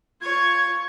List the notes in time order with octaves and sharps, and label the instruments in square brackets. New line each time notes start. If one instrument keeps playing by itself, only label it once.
[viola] F4 C#5 [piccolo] G#6